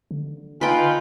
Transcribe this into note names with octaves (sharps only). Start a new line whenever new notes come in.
D3
D#4 F4 B4 G5 G#5